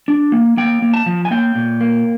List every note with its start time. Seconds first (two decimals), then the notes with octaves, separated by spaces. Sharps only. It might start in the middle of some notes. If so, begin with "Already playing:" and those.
0.08 D4
0.32 A#3
0.57 A#3 G5
0.82 A#3
0.94 A5
1.06 F3
1.25 G#5
1.31 A#3 G5
1.55 A#2
1.81 A#3